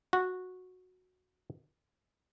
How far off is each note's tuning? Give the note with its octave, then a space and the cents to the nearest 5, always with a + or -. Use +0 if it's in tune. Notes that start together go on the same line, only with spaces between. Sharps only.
F#4 -10